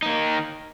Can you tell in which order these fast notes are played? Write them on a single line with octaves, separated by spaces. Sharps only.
D#4 A#3 D#3